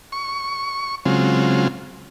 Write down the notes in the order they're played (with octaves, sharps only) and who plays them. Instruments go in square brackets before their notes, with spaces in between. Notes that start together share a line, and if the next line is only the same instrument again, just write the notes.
[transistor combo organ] C#6
C#3 F#3 G#3 C4 F4